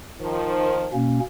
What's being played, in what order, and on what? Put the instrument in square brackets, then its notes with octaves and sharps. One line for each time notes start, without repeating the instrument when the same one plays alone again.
[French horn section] D#3 F3
[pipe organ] B2 A#3 C#4